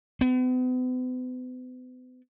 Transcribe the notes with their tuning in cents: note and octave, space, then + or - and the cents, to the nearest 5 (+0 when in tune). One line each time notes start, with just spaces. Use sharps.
B3 +40